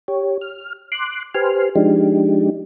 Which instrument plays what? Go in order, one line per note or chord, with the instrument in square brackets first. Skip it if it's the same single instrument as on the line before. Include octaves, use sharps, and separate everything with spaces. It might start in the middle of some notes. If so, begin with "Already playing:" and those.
[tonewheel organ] G4 C#5
F6
C6 D6 F#6
G4 B4 C5 G#5 C6 F6
F3 G#3 D4 D#4 G4